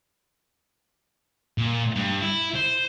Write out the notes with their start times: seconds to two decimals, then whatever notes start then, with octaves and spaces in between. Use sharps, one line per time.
1.58 A#2
1.96 G2
2.22 E4
2.56 C5